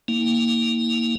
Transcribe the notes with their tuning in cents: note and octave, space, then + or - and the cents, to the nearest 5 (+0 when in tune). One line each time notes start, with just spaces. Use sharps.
A#3 +0 E4 -35